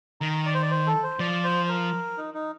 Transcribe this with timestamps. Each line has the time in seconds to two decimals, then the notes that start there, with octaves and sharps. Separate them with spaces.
0.21 D#3 A#5
0.46 D5
0.54 C5
0.62 D5
0.71 C5
0.87 A4
1.03 C5
1.19 F3 D5
1.44 C5
1.69 A#4
2.18 D#4
2.34 D#4